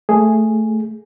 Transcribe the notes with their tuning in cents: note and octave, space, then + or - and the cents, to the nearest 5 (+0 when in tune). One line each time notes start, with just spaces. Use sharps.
A3 +0 G#4 +0